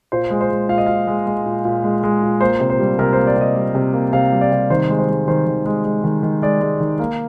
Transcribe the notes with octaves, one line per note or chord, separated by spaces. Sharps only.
A#2 C5
G#3
C5
G#3
A#2 F5
D#5
A#2 F5
G#3
G#3
A#2
A#2
G#3
G#3
A#2
A#3 C5
C3
C5
G3
C3 A#4
C5
A#3
D5
C3 D#5
G3
C3
A#3
C3 F5
G3
D5
C3
D#3 C5
G#3
C5
G#3
D#3 C5
D#3
G#3
G#3
D#3
D#3
G#3 D5
G#3
D#3
A#3